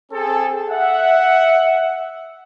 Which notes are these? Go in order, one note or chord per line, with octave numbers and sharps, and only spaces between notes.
C4 G#4 A4
E5 F#5